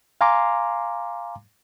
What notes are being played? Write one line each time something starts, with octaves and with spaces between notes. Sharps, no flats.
F5 G#5 A#5 C6 D6